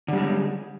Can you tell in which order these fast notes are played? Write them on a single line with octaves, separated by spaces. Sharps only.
D3 G3 G#3